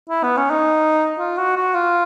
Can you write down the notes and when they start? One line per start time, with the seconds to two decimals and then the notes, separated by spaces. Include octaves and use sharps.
0.09 E4
0.23 B3
0.37 C#4
0.50 D#4
1.19 F4
1.38 F#4
1.56 F#4
1.74 F4